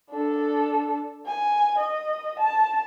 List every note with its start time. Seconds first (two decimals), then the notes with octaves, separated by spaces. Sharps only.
0.10 D4 A4
1.26 G#5
1.78 D#5
2.39 A5